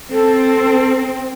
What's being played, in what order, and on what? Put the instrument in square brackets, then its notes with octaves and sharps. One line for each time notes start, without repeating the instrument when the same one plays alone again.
[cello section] C4 [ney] A4